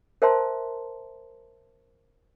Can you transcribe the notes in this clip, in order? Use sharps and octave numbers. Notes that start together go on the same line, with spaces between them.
A#4 C5 E5 A5 A#5 C6